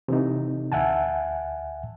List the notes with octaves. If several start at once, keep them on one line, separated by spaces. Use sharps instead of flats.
C3 E3 C4 D#4
D2 E5 F#5 G#5 A5